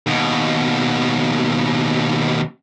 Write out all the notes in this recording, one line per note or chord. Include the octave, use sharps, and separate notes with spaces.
D#2 B2